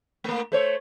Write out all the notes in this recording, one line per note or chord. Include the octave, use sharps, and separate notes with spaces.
A3 A#3
A3 C5 C#5